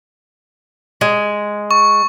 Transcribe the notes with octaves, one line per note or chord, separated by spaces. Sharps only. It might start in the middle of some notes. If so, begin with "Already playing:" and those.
G#3
C#6